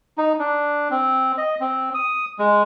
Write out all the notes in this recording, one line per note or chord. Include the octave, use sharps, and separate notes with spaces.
D#4
D4
C4
D#5
C4
D#6
G#3